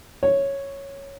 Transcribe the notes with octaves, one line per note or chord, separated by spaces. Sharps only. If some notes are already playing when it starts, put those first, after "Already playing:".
C#5